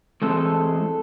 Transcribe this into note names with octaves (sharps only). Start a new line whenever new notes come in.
E3 G#3 C4 A4